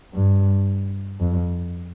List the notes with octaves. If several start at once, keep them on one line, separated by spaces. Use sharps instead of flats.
G2
F2